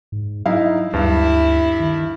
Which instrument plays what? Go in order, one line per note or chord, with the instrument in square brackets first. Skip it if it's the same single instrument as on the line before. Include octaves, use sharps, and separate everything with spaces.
[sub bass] G#2
[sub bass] F#3 [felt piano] D#4 E4 F5
[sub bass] D2 [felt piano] G2 [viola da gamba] E4
[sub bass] D#3